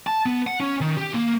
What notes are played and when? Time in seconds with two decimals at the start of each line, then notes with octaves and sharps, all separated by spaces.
0.07 A5
0.26 B3
0.47 F#5
0.60 C#4
0.81 D#3
0.97 G4
1.14 A#3